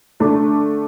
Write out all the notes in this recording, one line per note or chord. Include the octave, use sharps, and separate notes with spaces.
D3 A3 D4